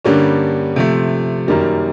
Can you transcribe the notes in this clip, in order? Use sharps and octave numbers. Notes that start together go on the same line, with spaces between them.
G2 D3 G3 A#3 C#4
C3 F3 A3
F#2 D#3 G3 A#3